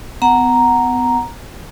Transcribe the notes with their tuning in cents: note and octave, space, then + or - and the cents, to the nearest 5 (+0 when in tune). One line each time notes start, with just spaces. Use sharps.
B3 +30 F#5 +0 A#5 +0